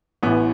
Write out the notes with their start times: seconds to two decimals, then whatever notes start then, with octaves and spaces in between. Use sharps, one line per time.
0.23 A1 A2 E3 B3